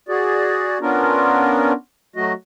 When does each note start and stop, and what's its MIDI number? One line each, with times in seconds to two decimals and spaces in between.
0.09 0.78 66
0.09 0.78 68
0.09 0.78 74
0.81 1.73 59
0.81 1.73 61
0.81 1.73 62
0.81 1.73 65
0.81 1.73 70
2.16 2.33 54
2.16 2.33 57
2.16 2.33 66
2.16 2.33 75